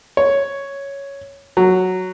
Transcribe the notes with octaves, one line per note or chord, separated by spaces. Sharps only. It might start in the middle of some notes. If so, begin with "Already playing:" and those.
C#5
F#3